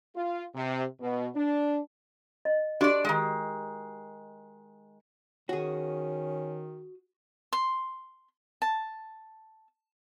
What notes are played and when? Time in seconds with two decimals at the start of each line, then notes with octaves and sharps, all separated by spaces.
0.15 F4
0.54 C3
1.01 B2
1.34 D4
2.45 D#5
2.81 D4 F#4 G4 D5
3.05 D#3 G#3
5.49 D#3 C#4 F#4 G#4
7.53 C6
8.62 A5